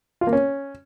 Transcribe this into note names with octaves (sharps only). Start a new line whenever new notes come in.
F4
A#3
C#4